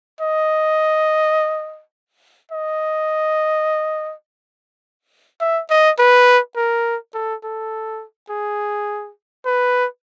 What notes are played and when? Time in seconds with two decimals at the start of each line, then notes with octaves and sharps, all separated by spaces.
0.21 D#5
2.52 D#5
5.41 E5
5.70 D#5
5.99 B4
6.56 A#4
7.14 A4
7.43 A4
8.30 G#4
9.46 B4